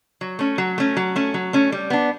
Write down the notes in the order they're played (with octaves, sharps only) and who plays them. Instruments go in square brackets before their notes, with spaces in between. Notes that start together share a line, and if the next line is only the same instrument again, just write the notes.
[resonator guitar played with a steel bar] F#3
A3 C#4
F#3
A3 C#4
F#3
A3 C#4
F#3
A3 C#4
G3
B3 D4